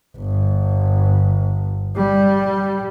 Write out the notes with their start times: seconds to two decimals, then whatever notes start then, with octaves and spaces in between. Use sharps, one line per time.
0.17 G1
1.96 G3